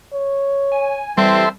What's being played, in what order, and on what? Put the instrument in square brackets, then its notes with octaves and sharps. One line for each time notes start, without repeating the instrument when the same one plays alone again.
[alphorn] C#5
[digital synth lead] G#5
[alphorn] E3 [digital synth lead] G3 [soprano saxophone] C4 [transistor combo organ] A4 E5 C6